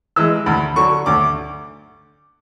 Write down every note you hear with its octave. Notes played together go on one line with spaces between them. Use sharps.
E3 G#3 E6
D2 B5
D3 F#3 C#6
D2 D6